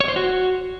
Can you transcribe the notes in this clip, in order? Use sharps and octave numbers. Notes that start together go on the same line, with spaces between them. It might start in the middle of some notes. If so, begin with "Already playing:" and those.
C#5
C5
F#4